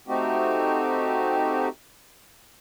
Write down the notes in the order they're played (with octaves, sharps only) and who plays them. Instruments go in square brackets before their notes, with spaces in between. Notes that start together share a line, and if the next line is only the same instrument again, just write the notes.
[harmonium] A3 C4 D#4 F#4 G4